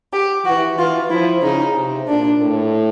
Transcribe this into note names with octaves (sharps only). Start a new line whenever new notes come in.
G4
E3 F#4
E3 F4
F3 E4
C#3 D#4
C3
A#2 D4
A2